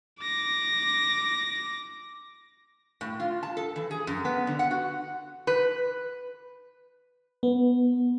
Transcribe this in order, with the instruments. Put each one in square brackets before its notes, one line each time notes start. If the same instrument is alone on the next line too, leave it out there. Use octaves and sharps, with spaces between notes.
[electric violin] D6 A#6
[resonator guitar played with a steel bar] A2
F4
A5
A4
E3
G#4
F#2
B3
D3
F#5
F#4
B4
[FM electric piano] B3